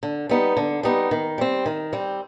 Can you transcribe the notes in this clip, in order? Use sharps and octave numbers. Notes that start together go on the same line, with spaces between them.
D3
G3 B3 D#4
D3
G3 B3 D#4
D#3
G3 C4
D#3
G3 C4